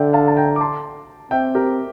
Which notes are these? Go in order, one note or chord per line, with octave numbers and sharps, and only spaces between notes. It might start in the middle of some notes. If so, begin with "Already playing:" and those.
Already playing: D3 D5 E5 G5
F5 A5
A5
G5 A#5
D6
A5 C6
C4 E5 G5
G4 A#4